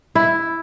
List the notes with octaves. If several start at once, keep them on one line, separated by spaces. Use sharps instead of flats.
E4